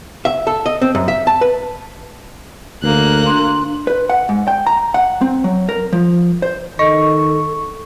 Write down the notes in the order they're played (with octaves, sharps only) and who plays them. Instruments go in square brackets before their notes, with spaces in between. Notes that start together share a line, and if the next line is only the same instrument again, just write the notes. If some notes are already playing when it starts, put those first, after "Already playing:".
[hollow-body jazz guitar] E5
A4
D#5
C4
F#2
E5
A5
B4
[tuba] D2 [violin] A#3 F#6
[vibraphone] D4 C6
[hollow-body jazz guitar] B4
F#5
G#2
G5
A#5
F#5
C4
F#3
A#4
F3
C5
[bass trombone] D#3 [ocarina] A4 [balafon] D#5 [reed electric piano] C#6